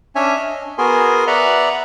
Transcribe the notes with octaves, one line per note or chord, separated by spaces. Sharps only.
C#4 D4 C#5 E5 G#5
D#5
B3 F#4 G#4 A#4 G#5 C6
B4 D5 E5 F#5 A#5 B5